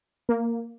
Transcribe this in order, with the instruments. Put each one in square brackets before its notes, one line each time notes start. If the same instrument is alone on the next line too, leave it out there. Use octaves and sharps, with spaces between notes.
[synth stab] A#3